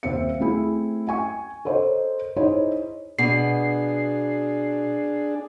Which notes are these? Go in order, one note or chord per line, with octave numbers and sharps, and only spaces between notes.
D#1 C4 C5 E5 F5 C#7
A3 C4 E4 G#4
G5 G#5 C#6
A4 A#4 C5 C#5 D#5
D#4 E4 G#4 C5 C#5
B2 D4 G#4 C7